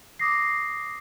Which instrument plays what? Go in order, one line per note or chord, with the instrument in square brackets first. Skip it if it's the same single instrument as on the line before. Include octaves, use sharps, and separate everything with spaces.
[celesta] D6 D#6 A#6 C7